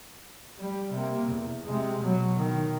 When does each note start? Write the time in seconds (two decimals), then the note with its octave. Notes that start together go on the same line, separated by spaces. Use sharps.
0.59 G3
0.93 C3 A#3
1.30 E2
1.65 C3 G#3
2.00 B2 F#3
2.37 B2 D#3